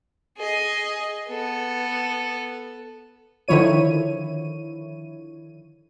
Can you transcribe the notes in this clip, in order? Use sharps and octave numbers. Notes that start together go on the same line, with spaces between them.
G#4 D#5
B3 A4
D3 D#3 F3 E4 C#5 D#7